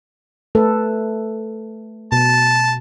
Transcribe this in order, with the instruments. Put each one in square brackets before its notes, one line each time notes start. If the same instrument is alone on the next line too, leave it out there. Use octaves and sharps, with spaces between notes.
[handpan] A3 A4 B4
[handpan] B2 [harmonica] A5